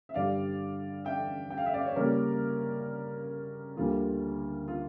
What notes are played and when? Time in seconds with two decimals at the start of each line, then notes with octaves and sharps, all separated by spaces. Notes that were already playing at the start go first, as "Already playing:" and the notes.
0.09 E5
0.14 G2 D3 G3 D5 F5
1.05 E5 G5
1.50 G5
1.58 F5
1.66 E5
1.74 D5 F5
1.85 C#5
1.96 C#3 G3 A#3 C#4 A#4 D5
3.76 D2 D3 G3 A#3 F4
4.68 F4